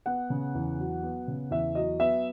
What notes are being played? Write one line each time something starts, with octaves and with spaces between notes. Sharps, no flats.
B3 F#5
C#3
E2
F#3
B3
C#3
E2 E5
F#3 D#5
B3 E5